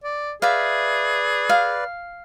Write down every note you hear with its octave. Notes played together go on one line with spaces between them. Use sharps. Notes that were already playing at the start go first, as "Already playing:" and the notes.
D5
G#4 B4 D5 E5 F5
F5